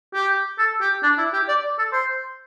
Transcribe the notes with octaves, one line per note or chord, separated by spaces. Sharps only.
G4
A4
G4
D4
E4
G4
D5
A4
C5